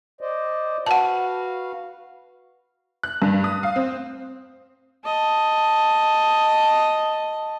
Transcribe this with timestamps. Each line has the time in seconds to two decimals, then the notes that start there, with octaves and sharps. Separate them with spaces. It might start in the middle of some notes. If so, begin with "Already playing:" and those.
0.21 C5 D5 D#5
0.86 F#4 B4 F5 F#5 A5
3.03 F#6
3.22 G2
3.44 D#6
3.63 F5
3.76 C4
5.05 D#5 A5